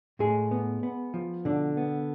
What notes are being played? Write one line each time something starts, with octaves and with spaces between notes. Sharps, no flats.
A2 G#3 G#4
B3
B3
F3
B2 D3 D4
B3